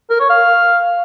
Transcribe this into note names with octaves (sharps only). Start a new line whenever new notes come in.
A#4
C#5
F5